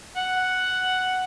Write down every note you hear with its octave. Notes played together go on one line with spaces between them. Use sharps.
F#5